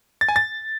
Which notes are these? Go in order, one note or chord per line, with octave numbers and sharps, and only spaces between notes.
A6
G#5
A6